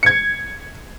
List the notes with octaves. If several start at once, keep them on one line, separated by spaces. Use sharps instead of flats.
G#6 C#7